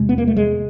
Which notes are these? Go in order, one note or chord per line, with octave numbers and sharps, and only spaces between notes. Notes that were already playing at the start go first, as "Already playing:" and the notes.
Already playing: E2 C3 G#3
B3
A#3
A3
G#3